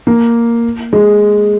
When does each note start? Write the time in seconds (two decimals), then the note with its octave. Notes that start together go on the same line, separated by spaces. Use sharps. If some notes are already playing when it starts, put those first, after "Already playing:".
0.07 A#3
0.93 G#3